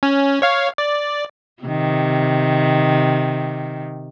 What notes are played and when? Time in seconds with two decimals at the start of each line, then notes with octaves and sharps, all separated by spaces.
0.03 C#4
0.42 C#5 F5
0.78 D5
1.63 C3 D#3